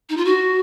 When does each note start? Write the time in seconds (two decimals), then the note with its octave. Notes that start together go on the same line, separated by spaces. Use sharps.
0.09 D#4
0.17 F4
0.25 F#4